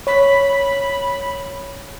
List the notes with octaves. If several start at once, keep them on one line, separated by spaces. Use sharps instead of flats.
C#5 B5